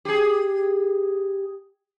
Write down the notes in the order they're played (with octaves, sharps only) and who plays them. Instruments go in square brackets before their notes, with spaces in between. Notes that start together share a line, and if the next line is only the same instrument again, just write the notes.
[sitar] G4 G#4